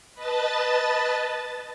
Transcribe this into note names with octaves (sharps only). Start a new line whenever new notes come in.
B4 D#5 A5 A6